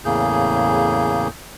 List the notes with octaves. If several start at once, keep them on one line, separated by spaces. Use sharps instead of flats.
E2 A2 C#3 A#3 G#4 G6